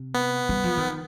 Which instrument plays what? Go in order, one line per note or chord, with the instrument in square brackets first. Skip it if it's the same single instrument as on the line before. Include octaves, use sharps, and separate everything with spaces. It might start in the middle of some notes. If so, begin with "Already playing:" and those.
Already playing: [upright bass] C3
[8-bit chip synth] B3
[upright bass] G3
F3
D#3